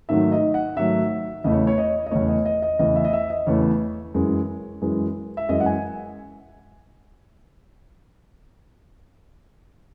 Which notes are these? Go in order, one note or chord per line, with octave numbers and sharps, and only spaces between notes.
G#2 D#3 F#3 A3 E5
D#5
F#5
G#2 D#3 F#3 A3 E5
E2 C#3 E3 A3 D#5
C#5
C#5
D#5
D#5
E2 C#3 E3 A3 C#5
D#5
D#5
D#5
E2 C#3 E3 A3 D#5
E5
D#5
E5
D#5
E2 C#3 E3 A3 C#5
F#2 E3 G#3
F#2 E3 G#3
E5
F#2 E3 G#3 D#5
F#5
G#5